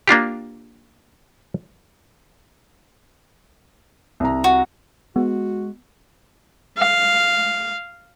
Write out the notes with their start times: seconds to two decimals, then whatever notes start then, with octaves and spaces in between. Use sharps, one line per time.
0.08 A#3 D4 F4 G4
4.20 C2 A#5
4.44 F#4
5.16 G#3 B3 F#4
6.79 F5